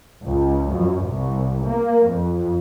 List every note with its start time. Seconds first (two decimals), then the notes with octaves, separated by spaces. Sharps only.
0.24 C#2
0.73 F#2
1.06 C2
1.66 A#3
2.09 F2